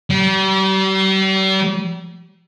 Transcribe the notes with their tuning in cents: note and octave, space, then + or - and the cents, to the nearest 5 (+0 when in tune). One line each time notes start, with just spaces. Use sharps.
G3 -40